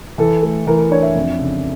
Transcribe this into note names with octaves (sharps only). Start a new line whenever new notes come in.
E3 A4
A3
E3 A#4
A#4
D4 C#5
E5
F2
C#3